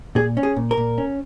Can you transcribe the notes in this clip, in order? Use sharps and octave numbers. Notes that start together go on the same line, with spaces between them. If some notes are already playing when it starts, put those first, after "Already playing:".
A#2 G#4
C#4
G#4
A#2
A#4
A#2
C#4